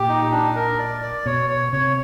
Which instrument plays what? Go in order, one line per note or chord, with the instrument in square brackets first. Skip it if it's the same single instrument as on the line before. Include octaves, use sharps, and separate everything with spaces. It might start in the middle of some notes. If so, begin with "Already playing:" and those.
Already playing: [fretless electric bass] A#2 [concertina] G4
[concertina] D#4
D4
A#4
D5
D5
[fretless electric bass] B2 [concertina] C#5
[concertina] C#5
[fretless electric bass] C3 [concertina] C#5